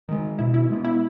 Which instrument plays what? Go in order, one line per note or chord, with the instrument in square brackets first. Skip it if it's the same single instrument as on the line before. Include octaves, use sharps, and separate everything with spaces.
[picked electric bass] D#3 G#3
[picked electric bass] B2 [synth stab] E4
[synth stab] E4
[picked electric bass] G#3 B3
[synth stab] E4